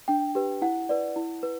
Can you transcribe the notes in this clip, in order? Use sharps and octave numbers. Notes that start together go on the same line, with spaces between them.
D4 G5
G4 B4
E4 F#5
B4 D5
E4
B4